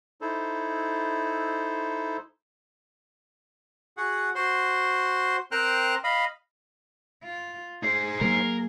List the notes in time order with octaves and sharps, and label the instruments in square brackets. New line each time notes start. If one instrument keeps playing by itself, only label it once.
[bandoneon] D#4 E4 A4 C5
[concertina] F#4 G#4 F#5
F#4 C5 C6
C4 A#4 C5 G5 F6 F#6
D#5 F5 B5
[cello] F4
[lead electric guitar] D#4 C5 [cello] G#4
[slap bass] F#3 A#3 [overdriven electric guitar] A#4